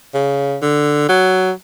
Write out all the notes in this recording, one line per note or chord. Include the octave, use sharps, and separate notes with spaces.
C#3
D3
F#3